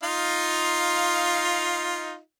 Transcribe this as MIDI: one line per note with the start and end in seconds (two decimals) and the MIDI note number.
0.03 2.18 63
0.03 2.18 65
0.03 2.18 77